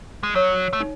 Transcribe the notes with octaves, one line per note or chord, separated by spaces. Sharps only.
G#3
F#3 C#5
A3
D#4